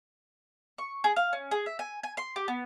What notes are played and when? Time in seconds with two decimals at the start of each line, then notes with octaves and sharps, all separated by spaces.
0.78 C#6
1.04 G#4
1.16 F5
1.33 C#4
1.51 G#4
1.66 E5
1.79 G#5
2.03 G#5
2.17 C6
2.36 G4
2.48 B3